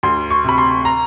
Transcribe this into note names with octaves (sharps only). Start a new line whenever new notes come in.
D2 C6
C#6
C3 B5
C6
A#5